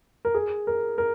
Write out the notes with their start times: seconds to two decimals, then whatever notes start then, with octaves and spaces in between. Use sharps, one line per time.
0.25 A#4
0.34 G#4
0.67 A#4
0.98 A#4